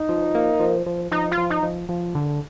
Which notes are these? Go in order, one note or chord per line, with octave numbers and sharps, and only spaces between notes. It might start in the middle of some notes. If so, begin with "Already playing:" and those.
Already playing: D#4
F3
A#3
F3
F3
F3 D#4
F4
F3
D#4
F3
F3
D3